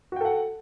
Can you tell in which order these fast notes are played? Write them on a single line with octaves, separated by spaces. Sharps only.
F#4 G5 A4 F#5